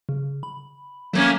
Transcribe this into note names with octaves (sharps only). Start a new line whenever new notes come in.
C#3
B5
F#3 A3 A#3 C#4